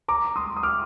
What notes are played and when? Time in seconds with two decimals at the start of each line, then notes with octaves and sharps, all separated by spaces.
0.08 A#5 D6
0.36 C6 D#6
0.56 D#6
0.63 D6 F6